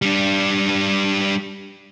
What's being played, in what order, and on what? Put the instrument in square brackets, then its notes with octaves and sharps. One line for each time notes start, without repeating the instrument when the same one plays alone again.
[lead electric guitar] G3 D4